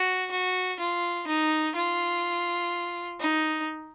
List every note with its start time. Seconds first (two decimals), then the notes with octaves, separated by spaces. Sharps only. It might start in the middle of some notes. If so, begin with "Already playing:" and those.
Already playing: F#4
0.31 F#4
0.79 F4
1.27 D#4
1.75 F4
3.20 D#4